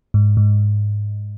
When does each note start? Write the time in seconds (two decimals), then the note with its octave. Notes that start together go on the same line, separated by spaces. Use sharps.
0.14 G#2
0.37 G#2